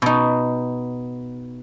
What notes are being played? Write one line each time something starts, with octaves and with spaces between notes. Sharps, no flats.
B2 D#4